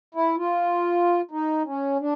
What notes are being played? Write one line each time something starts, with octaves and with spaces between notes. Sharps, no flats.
E4
F4
D#4
C#4
D4